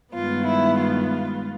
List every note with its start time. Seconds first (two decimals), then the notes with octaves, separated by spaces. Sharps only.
0.13 G2 D#3 G#3 B3 F4
0.46 E4
0.78 F4